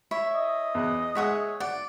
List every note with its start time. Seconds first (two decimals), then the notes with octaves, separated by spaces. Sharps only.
0.11 E4 C#5 E5
0.34 D#5
0.75 E2 F#6
1.15 G#3 G#4 C#5 E5 F#5 D#6
1.60 D5 F#5